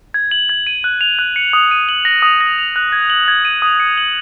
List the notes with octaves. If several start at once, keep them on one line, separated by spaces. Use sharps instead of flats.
G#6
F#7
G#6
D#7
F#6
F7
F#6
C#7
D#6
D#7
F#7
A#6
D#6
A#6
F7
F#6
G#6
F#7
G#6
D#7
D#6
C#7
F#7